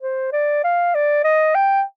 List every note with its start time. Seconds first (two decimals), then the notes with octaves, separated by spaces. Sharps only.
0.01 C5
0.33 D5
0.64 F5
0.95 D5
1.24 D#5
1.55 G5